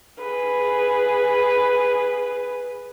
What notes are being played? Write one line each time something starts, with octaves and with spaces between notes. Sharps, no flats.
G#4 B4